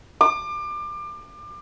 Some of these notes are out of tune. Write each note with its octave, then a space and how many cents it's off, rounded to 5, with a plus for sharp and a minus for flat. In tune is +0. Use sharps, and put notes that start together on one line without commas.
D6 +30